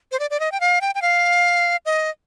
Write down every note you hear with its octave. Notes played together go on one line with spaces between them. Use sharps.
C5
D5
D5
D#5
G5
F5
G5
G5
F5
D#5